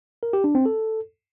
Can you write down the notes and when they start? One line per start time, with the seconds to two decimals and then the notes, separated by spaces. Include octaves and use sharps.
0.23 A#4
0.33 G4
0.44 D4
0.55 C4
0.66 A4